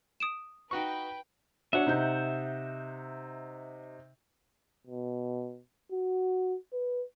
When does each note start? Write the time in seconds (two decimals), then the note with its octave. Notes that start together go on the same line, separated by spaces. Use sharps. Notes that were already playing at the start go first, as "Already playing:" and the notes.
0.20 D#6 D7 E7
0.71 D#4 F#4 B4 G5 C#6
1.73 D4 F#4 C#5 E5 F#5
1.87 C3 D#4 G6
4.87 B2
5.92 F#4
6.73 B4